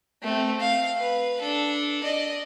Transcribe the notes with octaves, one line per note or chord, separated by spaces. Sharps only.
A3 C4
F5
B4
D4 A4
D5 D#5